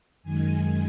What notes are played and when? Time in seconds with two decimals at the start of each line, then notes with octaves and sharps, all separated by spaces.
0.23 F#2 D#3 G#3 G#5
0.51 G#5